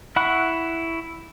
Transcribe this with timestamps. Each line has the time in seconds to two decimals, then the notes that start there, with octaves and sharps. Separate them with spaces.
0.16 E4 F#5 B5 C#6 F#6